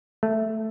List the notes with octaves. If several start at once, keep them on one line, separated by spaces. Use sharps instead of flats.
A3